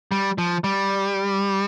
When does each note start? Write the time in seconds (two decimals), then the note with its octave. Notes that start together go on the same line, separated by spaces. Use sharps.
0.12 G3
0.38 F3
0.64 G3